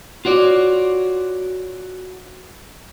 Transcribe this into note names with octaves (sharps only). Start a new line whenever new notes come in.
F4 F#4 C#5 D5